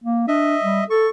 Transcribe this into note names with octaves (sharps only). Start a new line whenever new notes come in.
A#3
D4 D#5 E5
G3
A4 C#6